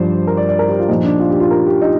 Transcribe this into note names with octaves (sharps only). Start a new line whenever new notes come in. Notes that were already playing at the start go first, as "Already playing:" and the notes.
Already playing: G2 F3 C5 D5
A#4
D5
D5
A#4
G4
F4
A#2 F3 D#4
D4
F4
G4
F4
A#4
G4
D#4